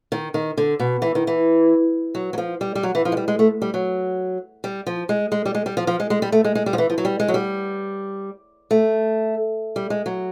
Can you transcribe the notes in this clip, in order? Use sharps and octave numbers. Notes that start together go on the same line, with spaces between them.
D#3
D#3
D3
B2
E3
D#3
E3
F#3
F#3
F3
G3
G3
F#3
E3
F3
G#3
G3
G#3
A3
G3
F#3
G3
F3
G#3
G#3
G3
G#3
G3
F3
F3
G#3
G#3
G3
A3
G#3
G#3
G3
F3
E3
F3
F#3
G3
G#3
F#3
G3
A3
G3
G#3
F#3